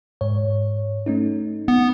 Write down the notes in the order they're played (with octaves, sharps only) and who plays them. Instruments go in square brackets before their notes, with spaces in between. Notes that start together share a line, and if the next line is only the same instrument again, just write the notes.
[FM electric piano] G#2 C#5
A3 C#4 D#4
[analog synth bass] B3